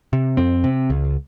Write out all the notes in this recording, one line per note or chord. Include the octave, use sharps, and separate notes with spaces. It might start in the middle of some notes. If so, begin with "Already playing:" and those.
C3
F2 C4
C3
C#2